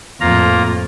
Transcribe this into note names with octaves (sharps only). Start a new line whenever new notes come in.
F2 A2 A#3 F4 A#5